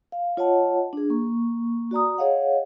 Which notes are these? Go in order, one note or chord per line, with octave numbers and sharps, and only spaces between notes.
F5
F4 C#5 D#5 F#5 A5
D4 G#4
A#3 C#6
F#4 D5 A#5 D#6
G#4 C#5 D#5 F5 F#5